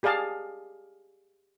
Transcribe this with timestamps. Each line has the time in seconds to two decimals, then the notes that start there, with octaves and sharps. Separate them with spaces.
0.03 G4 G#4 D5 F5 A5 D#6